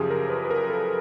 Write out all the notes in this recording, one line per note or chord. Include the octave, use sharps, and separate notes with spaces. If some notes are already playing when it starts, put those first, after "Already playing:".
Already playing: F#2 C#3 F3 G4 G#4
A#4
B4
B4
A#4
A4